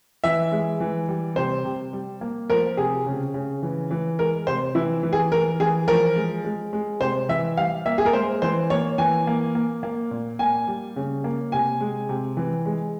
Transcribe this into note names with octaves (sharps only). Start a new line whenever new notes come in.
E3 E5
G#3
E3
G3
C3 C5
C3
G3
A#3
F3 A#4
C3 G#4
C#3
C#3
E3
E3
G#3 A#4
C3 C5
E3 E4
E3
G#4
E3 A#4
E3 G#4
F3 A#4
G#3
G#3
G#3
C3 C5
E3 E5
G3 F5
A#3 E5
G#4
A#4
G#3 C5
E3 C5
A#3 C#5
E3 G#5
A#3
A#3
A#3
A#2
A#3 G#5
G3
C#3
A#3
C3 G#5
G#3
C3
E3
G#3